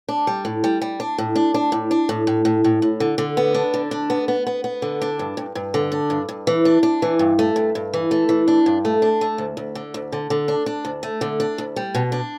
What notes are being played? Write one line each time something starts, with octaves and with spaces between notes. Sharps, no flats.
D4
G3
A2
G3
G3
D4
A2
D4
D4
A2
D4
A2
A2
A2
A2
A2
D3
D3
B3
D4
D3
D4
B3
B3
B3
B3
D3
D4
G2
G2
G2
D3
D4
G2
G2
E3
D4
D4
E3
G2
A3
G2
G2
E3
A3
E3
D4
G2
A3
D4
A3
D2
D2
D3
D2
D3
D3
D4
D4
D2
A3
D3
D4
D2
G3
B2
D4